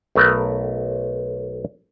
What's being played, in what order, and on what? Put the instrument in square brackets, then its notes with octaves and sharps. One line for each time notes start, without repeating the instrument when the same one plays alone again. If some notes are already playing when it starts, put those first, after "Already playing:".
[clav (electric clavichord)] B1 A3 B3 A#4